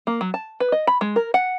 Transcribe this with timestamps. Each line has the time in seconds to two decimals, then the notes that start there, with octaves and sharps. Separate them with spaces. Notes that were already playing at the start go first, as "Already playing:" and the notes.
0.07 A#3
0.21 F#3
0.34 A5
0.60 B4
0.72 D#5
0.87 B5
1.01 G#3
1.16 A#4
1.34 F#5